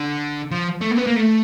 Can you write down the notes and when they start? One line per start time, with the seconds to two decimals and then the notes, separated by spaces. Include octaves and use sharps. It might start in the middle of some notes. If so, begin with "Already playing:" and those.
Already playing: D3
0.51 F3
0.81 A3
0.91 A#3
0.96 B3
1.06 A#3
1.16 A3